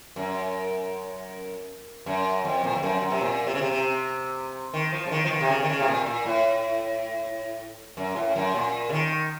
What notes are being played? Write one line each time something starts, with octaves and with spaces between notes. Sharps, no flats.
F#2
F#2
F2
A#2
F2
F#2
F#2
C3
A#2
C3
C#3
C3
C3
D#3
F3
C#3
D#3
F3
D#3
C3
C#3
D#3
C#3
C3
A#2
A#2
A2
F#2
A2
F#2
A#2
C#3
D#3